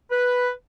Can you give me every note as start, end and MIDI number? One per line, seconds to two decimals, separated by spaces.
0.11 0.49 71